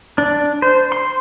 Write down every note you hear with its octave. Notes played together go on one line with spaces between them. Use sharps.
D4
C5
C6